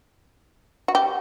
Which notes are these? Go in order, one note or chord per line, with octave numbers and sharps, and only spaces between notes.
F#4
G4